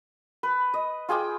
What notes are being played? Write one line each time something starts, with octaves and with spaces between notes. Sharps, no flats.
B4
D#5
F4 G#4 G5 D6